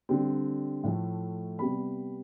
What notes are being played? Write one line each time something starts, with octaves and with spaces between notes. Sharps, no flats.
D3 G3 C4
A2 F3 A3
C3 G3 B3 B5